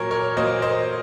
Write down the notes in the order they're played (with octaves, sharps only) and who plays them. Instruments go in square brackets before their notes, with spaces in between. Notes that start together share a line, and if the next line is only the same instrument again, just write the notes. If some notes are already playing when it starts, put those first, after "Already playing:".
Already playing: [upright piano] A#2 F#3 A#3 A#4 C#5
A#4 C#5
A#2 F#3 A#3 C5 D#5
C5 D#5